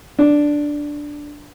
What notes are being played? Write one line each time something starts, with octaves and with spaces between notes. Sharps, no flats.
D4